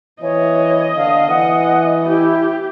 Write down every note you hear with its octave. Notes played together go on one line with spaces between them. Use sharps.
E3 C#5 D#5
D3 F5
E3 F#5
E4 G4